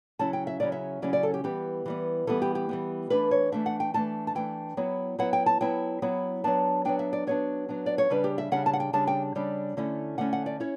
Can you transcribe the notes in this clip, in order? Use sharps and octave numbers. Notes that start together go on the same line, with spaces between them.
C#3 F#3 C#4 E4 A5
G5
E5
C#3 F#3 C#4 E4 D5
E5
C#3 F#3 C#4 E4 D5
D5
A4
G4
E3 G3 B3 G4
E3 G3 B3
E3 G3 B3 A4
G4
G4
E3 G3 B3
E3 A3 D4 B4
C#5
E3 A3 D4 E5
F#5
G5
E3 A3 D4 A5
A5
E3 A3 D4 G5
F#3 B3 E4
F#3 B3 E4 F#5
G5
A5
F#3 B3 E4 G5
F#3 B3 E4
F#3 B3 D4 A5
F#3 B3 D4 G5
E5
D5
F#3 B3 D4 C#5
F#3 B3 D4
D5
C#5
C#3 G3 D4 B4
G4
E5
C#3 G3 D4 F#5
A5
F#5
G5
C#3 G3 D4 A5
G5
C#3 G3 D4
D3 A3 C#4 E4
D3 A3 C#4 E4 F#5
F#5
D5
C#4 E4 C#5